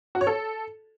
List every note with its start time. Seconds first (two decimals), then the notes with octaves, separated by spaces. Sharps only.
0.15 F#4
0.21 C#5
0.27 A4